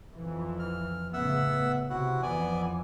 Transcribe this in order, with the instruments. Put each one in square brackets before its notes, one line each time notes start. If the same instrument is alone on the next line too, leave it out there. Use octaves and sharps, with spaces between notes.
[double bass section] F2 E3
[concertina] F6
[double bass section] A2 C#3 B3 [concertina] E5 F#5 E6
[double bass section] C3 [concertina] E4 F#4 F#5
[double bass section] F2 E3 [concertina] B3 D5 G#5